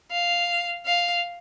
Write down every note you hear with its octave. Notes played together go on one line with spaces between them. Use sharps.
F5
F5